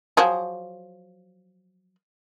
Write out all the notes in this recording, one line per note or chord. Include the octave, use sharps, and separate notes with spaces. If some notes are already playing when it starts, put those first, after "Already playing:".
F3 F#3 G#4